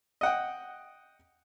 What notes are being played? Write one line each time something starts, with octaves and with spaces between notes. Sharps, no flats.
D#5 F#5 G5